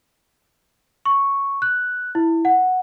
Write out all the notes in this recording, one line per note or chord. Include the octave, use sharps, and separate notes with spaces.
C#6
F#6
E4
F#5